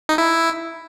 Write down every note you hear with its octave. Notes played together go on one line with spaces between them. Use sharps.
D#4
E4